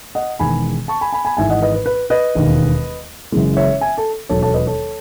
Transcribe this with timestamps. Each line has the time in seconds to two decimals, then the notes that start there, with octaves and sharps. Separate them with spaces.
0.15 D#5 F#5
0.39 E1 E2 D#3 G#3 G#5 B5
0.88 A5 C#6
1.01 G#5 B5
1.13 G#5 B5
1.25 G#5 B5
1.37 G#1 G#2 E3 E5 G#5
1.50 D#5 F#5
1.62 B4 D#5
1.74 B4
1.86 B4
2.10 B4 D#5
2.35 E1 D#2 D#3
3.32 F#1 F#2 E3 G#3
3.57 C#5 E5
3.81 E5 G#5
3.98 A4
4.29 E1 D#2 D#3 F#3 A4 C#5
4.42 A4 C#5
4.54 B4 D#5
4.67 A4 C#5